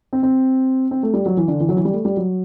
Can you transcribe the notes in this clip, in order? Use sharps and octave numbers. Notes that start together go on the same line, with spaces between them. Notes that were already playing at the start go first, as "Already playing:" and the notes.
C4
C4
C4
A3
G3
F#3
E3
D3
E3
F#3
E3
G3
A3
G3
F#3